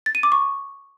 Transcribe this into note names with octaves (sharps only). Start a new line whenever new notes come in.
A6
D#7
D6
C#6